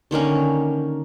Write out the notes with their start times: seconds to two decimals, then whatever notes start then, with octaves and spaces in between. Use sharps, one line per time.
0.11 D3 D#3 A#3 C#4